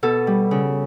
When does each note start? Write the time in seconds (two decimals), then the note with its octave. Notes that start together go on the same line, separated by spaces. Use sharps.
0.03 B2 A4
0.27 G3
0.51 C#3